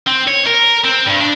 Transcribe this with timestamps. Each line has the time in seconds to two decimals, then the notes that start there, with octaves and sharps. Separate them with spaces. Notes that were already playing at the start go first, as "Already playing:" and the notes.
0.07 C4
0.28 C#5
0.47 A#4
0.85 C4
1.07 G2
1.21 D4